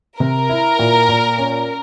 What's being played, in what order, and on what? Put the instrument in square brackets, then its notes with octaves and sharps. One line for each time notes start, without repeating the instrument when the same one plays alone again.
[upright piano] C3 [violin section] A#4
[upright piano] E4
A#2
A#2
C#4